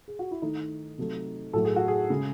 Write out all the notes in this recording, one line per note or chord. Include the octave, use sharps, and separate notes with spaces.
G#4
F#4
E4
D#3 A3 D#4
C3 F#3 A3
A2 F#3 A3 A4
G#4
F#4
G#4
C#3 G#3